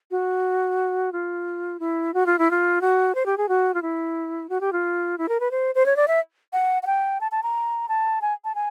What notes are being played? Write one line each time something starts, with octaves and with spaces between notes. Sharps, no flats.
F#4
F4
E4
F#4
F4
E4
F4
F#4
C5
G4
G#4
F#4
F4
E4
F#4
G4
F4
E4
A#4
B4
C5
C5
C#5
D5
E5
F#5
F#5
G5
A5
A5
A#5
A5
G#5
A5
G#5